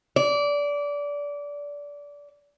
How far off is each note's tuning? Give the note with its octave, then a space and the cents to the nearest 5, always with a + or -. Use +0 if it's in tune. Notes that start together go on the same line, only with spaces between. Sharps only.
D5 -20